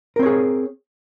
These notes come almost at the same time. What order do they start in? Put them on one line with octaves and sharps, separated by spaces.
A#4 C4 C#5 G#4